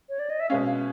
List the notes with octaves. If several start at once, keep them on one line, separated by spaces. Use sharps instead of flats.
C#5
D5
D#5
E5
B2 G#3 C#4 F5
F5